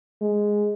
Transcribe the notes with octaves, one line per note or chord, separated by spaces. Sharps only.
G#3